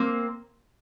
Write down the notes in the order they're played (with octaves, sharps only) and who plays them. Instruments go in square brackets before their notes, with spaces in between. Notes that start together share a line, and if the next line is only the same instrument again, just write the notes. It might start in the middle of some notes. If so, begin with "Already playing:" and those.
Already playing: [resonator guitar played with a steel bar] A#3 C4